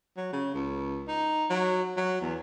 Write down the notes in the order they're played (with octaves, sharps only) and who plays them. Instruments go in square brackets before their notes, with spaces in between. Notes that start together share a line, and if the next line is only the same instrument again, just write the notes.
[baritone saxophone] F#3
C#3
C#2
D#4
F#3
F#3
E2